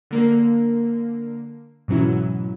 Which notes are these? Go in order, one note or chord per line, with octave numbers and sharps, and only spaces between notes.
D3 A#3 A#4
G#2 B2 E3 F#3 C#4 E4